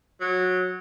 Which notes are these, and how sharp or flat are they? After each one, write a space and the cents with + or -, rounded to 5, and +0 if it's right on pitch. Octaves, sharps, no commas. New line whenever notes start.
F#3 -15